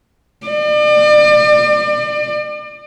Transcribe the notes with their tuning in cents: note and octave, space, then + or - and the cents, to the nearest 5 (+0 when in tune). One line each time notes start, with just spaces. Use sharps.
D5 +40